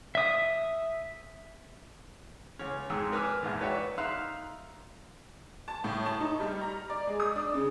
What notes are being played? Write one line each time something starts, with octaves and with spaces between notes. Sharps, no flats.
E5 D#6
C#2 C#4
F2 G#2 C4 G#4 A#5 E6
A#4 B4 G#5 D6 E6 F6
A#1 E2 G#2
F#4 B4 C#5 D5 E5 G5
D#4 E5 F5 C6 F#6
A5
A2
A5
D#4
G3
A#5
D5
G#3
D#6
D4
C#3